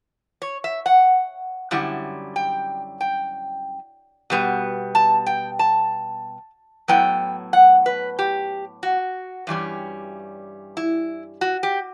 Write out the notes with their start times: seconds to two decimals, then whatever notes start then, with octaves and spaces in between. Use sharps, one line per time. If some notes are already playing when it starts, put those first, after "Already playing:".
0.42 C#5
0.64 E5
0.86 F#5
1.71 F#2 D3 G3 C#4 E4
2.36 G5
3.01 G5
4.30 B2 G3 B3
4.95 A5
5.26 G5
5.59 A5
6.88 A2 F#3 B3 E4 G5
7.53 F#5
7.86 B4
8.19 G4
8.83 F#4
9.47 G2 E3 G3 C#4
10.77 E4
11.41 F#4
11.63 G4